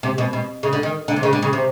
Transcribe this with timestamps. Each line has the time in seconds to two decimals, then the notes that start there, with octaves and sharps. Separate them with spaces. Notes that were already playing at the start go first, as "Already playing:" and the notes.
0.03 C3
0.18 B2
0.33 B2
0.63 C#3
0.73 D3
0.83 D#3
1.08 D3
1.16 C3
1.23 C#3
1.33 D3
1.42 C#3
1.53 C3